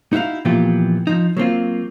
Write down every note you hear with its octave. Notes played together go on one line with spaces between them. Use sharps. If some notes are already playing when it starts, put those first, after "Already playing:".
D#4 E4 F#4 E5 F5
A#2 E3 F3 B3 F4 G4
F3 D#4
F#3 A#3 C4 F4